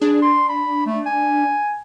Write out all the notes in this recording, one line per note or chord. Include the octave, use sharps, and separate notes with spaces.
D4 G#4
C6
B5
A3
G#5